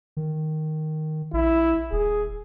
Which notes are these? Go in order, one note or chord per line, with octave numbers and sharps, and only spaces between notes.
D#3
A#1 E4
D#1 G#4